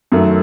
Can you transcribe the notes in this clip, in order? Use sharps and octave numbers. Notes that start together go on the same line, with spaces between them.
F#2 D#3 F#3 A3